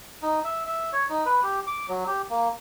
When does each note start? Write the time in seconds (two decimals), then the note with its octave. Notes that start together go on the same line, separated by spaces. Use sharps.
0.22 D#4
0.44 E5
0.66 E5
0.93 C#5
1.10 D#4
1.26 B4
1.43 G4
1.67 D6
1.89 F#3
2.07 G4
2.30 A#3